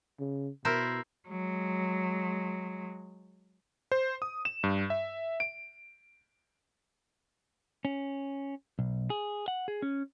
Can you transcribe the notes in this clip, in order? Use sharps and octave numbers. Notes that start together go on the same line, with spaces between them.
C#3
B2 E4 A#4 C5
F#3 G#3
C5
D#6
E7
G2
E5
D7
C#4
B1
G#4
F#5
G#4
C#4